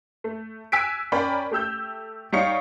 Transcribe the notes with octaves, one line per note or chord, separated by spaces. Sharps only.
A3
G#5 E6 F#6 B6 D7
C#4 A#4 D5 G5 B5
A3 G4 E6 G6
G3 D#4 C#5 F5 C#6 C#7